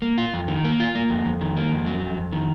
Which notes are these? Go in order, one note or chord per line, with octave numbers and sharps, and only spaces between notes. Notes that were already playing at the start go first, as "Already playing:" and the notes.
A#3
F4
F2
D#3
A#3
F4
A#3
F2
F2
D#3
A#3
F2
F#3
F2
F2
D#3